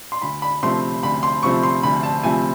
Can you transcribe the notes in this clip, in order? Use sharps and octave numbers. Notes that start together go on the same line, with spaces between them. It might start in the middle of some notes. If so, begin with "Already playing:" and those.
C6
D2 B5
B5
C3 F3 A3 C6
D2 B5
C6
C3 F3 A3 C#6
C6
D2 B5
A5
C3 F3 A3 G#5